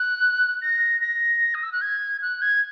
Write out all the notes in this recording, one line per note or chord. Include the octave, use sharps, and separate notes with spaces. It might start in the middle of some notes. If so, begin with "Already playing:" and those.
Already playing: F#6
A#6
A#6
D#6
E6
F#6
G#6
F#6
G#6